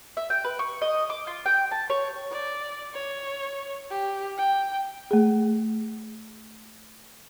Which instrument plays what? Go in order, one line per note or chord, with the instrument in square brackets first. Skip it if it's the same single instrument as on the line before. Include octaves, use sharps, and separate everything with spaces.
[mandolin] E5
G5
B4
C#6
D#5
D6
F4
G5
A5
C#5
[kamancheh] D5
C#5
G4
G5
[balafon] A3 G#4